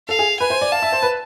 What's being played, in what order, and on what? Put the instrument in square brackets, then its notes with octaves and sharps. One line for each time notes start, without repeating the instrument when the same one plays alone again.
[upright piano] A4 [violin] F5
[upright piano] G#4
[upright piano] B4 [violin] G#5
[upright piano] C5
D5
[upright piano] F5 [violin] A5
[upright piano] E5
C5
B4